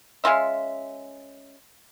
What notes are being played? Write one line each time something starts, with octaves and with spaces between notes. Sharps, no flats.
G#3 C#4 F4 E5